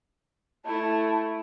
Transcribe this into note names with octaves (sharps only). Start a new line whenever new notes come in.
A3 E4 A5